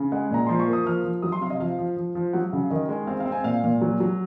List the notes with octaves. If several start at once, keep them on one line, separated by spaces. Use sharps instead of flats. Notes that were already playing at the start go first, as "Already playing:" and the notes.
Already playing: C#3
G#3 F#5
A#2 A#5
F3 C6
C#6
A#3
D#6
F3 F6
F3
F#3 D#6
C6
C3 F5
D#5
F3 F5
F3
F3
F3
F#3 F#5
C#3 F5
D#3 D#5
G#3
C4 F5
F5
C4
G#5
A#2 F5
A#2
F#3
F#3